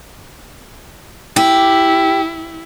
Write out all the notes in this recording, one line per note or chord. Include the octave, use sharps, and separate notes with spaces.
E4 G4